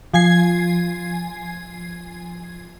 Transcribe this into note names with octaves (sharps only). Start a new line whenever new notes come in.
F3 G#5 G#6 C7